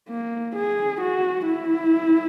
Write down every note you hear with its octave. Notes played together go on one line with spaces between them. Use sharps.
A#3
G#4
F#4
E4